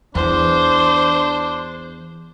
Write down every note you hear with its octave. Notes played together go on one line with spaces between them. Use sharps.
E2 E3 D4 C5